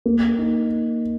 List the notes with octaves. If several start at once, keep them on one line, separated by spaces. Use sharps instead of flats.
A#3
D#4